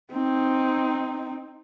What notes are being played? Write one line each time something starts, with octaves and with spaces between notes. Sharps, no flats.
C4 D#4